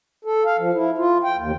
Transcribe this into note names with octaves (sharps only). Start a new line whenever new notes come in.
A4
F5
F3
E4
F4
G5
D#2